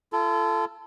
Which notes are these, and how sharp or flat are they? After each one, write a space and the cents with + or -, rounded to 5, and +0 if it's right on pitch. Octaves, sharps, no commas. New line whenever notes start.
F4 -40 A4 +0